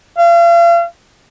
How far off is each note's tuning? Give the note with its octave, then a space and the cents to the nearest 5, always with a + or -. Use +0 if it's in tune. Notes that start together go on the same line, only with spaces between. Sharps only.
F5 -40